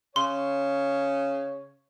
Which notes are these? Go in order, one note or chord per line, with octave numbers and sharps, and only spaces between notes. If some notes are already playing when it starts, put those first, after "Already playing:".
C#3 C#5 C6